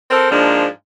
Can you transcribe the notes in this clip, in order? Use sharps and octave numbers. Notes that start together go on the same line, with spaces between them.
C4 A4 A#4 C5
G#2 F3 A#3 D4